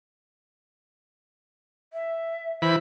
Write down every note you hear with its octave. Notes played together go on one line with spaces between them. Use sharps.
E5
E3 C5 B5